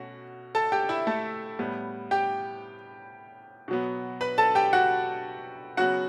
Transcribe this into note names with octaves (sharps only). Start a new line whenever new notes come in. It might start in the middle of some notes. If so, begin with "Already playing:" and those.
Already playing: B2 A3 C#4 F#4
A4 A5
G4 G5
E4 E5
A3 A4
A2 G3 B3
G4 G5
B2 F#3 B3
B4 B5
A4 A5
G4 G5
F#4 F#5
C#3 F#3 B3 F#4 F#5